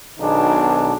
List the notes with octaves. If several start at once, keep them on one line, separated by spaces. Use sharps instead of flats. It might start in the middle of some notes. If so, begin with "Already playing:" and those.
B1 B2 D#3 D4 D#4 G#4